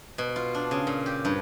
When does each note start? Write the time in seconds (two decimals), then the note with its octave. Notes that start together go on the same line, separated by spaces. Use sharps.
0.18 B2
0.36 F4
0.55 D4
0.71 C#3
0.87 A#2
1.06 G4
1.25 G2